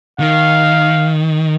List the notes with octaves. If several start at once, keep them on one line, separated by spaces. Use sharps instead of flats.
D#3 F5